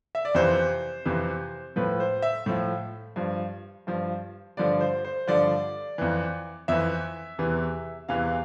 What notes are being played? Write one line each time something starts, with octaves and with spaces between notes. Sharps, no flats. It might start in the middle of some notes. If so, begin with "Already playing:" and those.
E5
D5
F2 C3 E3 C5
F2 C3 E3
A2 F3 B4
C5
E5
A2 F3
G2 F3
G2 F3
G2 D3 F3 D5
C5
C5
G2 D3 F3 D5
F2 E3
F2 E3 E5
E2 C3 E3
E2 C3 E3 F5